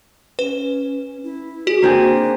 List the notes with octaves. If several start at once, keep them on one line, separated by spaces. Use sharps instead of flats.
C#4 B4
E4
F#4 G#4
A#3 C4 D4 G#4